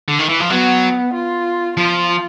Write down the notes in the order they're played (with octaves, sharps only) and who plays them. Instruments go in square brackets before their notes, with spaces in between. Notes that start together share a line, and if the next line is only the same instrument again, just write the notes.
[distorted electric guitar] D3
D#3
E3
F3
[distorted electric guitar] F#3 [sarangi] B3
[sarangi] F4
[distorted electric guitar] F3 [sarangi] F4